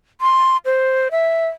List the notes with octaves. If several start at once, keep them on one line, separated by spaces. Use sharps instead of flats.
C6
C5
E5